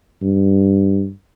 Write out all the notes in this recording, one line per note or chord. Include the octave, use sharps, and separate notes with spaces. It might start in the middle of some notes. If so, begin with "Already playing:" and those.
G2